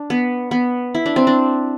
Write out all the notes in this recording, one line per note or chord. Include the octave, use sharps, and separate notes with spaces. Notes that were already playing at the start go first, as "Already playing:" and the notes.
Already playing: D4
B3
B3
E4
D4
C4
D4